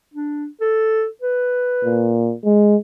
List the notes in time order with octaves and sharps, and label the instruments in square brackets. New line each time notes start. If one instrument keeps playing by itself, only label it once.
[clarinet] D4
A4
B4
[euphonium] A#2
G#3